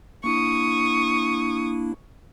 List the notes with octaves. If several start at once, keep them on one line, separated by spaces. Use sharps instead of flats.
A#3 D4 E4 C#6 D#6